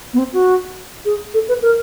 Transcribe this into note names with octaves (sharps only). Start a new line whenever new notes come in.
B3
C4
F#4
G#4
A4
B4
A#4